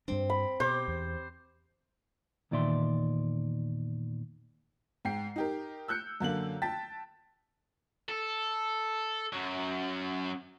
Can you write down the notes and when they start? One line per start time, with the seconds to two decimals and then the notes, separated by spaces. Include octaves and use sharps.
0.08 G2 G3 C4 D4
0.30 B5
0.60 B2 G4 C5
0.88 E2
2.51 E2 A#2 D#3 D5 E5 C6
5.05 G#2 G5 C7
5.36 D#4 G4 A#4
5.88 E6 F#6 G6 C#7
6.20 F#2 D3 A#3 F#7
6.62 G5 A5 A6 B6
8.09 A4
9.33 F#2 F#3